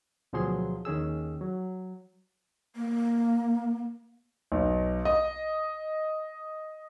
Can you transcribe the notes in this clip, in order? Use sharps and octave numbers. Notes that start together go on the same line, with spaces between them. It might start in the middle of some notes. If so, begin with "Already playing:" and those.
D2 B2 F3 F#3 G#4 C6
D#2 D#3 C#4 G#4 E6
F#3
A#3
B1
D#5